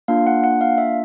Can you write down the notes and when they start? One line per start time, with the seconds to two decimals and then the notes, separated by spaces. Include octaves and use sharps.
0.08 A#3 D4 F4 F5
0.27 F#5
0.44 F#5
0.61 F5
0.78 E5